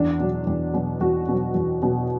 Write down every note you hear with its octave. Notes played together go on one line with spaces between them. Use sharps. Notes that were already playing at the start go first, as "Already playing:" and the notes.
Already playing: E2 D4
B2 F#3
E2
B2 F#3
E2 F#4
B2 F#3
E2
B2 F#3